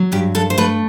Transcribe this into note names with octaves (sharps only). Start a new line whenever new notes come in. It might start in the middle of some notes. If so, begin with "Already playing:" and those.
Already playing: F#3
G2 G4
G2 A4
C5
A3 B4